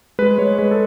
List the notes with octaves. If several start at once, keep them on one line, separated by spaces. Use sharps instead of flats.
G#3 B4
G#3 C#5
G#3 B4
A4